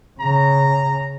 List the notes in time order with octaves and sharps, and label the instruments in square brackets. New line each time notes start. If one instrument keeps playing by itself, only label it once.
[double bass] C#3 [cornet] A#5